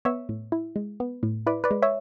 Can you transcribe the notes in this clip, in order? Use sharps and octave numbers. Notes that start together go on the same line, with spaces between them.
B3 C#5 E5
A2
E4
G#3
B3
A2
E4 B4 D5
B4 D5
G#3
C#5 E5